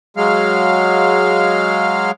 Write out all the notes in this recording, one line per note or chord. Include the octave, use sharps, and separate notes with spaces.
F#3 G#3 F5